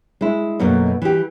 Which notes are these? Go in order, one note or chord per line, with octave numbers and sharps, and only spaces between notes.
G#3 E4
F#2 B2 A3 A#3 D#4
E3 G4